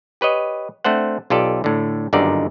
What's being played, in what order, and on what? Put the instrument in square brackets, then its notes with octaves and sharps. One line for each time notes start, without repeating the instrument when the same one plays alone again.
[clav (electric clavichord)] G4 B4 C#5 D#5
A3 C4 D4 C5 F#5
B1 F4 G4 A4 D5
A2 D3
G1 F#2 D3 D#3 D#4 D5